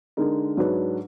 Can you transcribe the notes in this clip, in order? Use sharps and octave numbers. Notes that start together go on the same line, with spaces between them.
D3 G#3 D#4 A#4
G#2 F#3 D4 F#4 B4